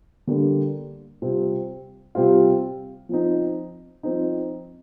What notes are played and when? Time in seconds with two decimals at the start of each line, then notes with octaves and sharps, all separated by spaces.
0.27 D3 G3 A#3 D4
1.22 C3 G3 C4 F4
2.15 C3 G3 C4 F4
3.09 F3 C4 D#4
4.03 F3 C4 D#4